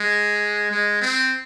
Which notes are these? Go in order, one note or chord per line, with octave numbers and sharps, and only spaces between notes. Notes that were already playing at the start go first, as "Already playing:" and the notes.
Already playing: G#3
G#3
C4